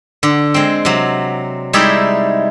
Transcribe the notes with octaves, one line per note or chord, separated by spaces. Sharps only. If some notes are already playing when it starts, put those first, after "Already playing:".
D3
G#3 C4
C3 F#3
G3 G#3 D#4 E4 D5 E5